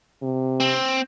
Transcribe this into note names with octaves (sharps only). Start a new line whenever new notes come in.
C3
C4